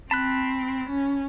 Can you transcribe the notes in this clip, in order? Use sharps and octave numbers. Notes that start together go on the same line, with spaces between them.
C4 A5 B5 F#6
C#4